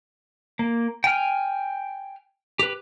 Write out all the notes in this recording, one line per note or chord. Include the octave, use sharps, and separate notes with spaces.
A#3
G5 G#5 F6
G4 B4